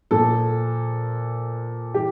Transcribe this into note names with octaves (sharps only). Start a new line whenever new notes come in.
A#2 F3 A4
E3 G4